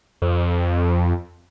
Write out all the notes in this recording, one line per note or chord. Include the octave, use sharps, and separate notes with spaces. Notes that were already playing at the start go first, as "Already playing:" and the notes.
F2